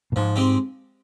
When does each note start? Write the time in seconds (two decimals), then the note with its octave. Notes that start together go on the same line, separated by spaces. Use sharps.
0.12 A#2
0.16 G#2 F3
0.36 G#3 C4 G4